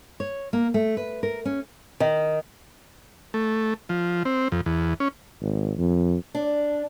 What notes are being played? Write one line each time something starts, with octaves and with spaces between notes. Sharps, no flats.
C#5
A#3
A3
B4
A#4
C#4
D#3
A3
F3
C4
F2
E2
C#4
G#1
F2
D4